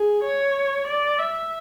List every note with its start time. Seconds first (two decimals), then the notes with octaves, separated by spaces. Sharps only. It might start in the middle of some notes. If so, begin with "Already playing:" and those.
Already playing: G#4
0.24 C#5
0.88 D5
1.19 E5